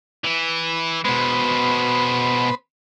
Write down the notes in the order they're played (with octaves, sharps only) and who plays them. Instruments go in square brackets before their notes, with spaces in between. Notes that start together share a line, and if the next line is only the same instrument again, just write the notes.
[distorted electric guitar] E3 E4
[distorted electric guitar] B2 G#3 [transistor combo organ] B3 B4 C5